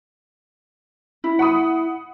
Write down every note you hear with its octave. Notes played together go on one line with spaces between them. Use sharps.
E4
F#5 B5 D#6